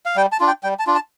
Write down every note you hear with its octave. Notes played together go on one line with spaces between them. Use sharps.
F5
G3 G5
A5
D4 F4
G5
G3 G5
A5
D4 F4
A5